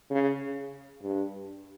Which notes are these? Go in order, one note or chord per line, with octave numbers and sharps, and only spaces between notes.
C#3
G2